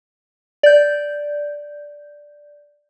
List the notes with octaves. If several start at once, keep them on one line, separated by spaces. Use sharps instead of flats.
D5 G6